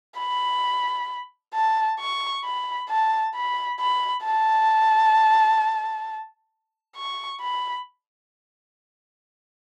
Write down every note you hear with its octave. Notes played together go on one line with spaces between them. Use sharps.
B5
A5
C#6
B5
A5
B5
B5
A5
C#6
B5